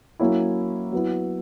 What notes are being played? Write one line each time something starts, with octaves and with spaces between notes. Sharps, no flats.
F#3 A#3 C#4 E4
F#3 B3 E4